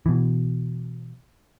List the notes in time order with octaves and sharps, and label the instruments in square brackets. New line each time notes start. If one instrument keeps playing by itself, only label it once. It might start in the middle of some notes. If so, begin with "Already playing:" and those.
[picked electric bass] B2 E3